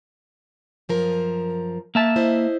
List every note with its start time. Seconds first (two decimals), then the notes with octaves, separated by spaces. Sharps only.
0.89 F#2 F3 A#4
1.95 A#3 E5 A5
2.16 E4 C5 D#5